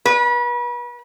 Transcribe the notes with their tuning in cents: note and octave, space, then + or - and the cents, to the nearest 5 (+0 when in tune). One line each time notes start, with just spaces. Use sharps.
B4 -35